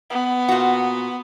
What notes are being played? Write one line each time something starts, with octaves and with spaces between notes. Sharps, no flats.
B3
A#2 F#4